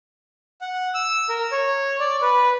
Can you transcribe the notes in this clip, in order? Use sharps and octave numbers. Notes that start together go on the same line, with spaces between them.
F#5
E6
A#4
C#5
D5
B4